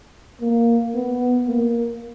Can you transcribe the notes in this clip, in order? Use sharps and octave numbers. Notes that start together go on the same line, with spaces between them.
A#3
B3
A#3